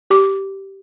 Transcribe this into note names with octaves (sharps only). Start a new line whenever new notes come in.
G4 D6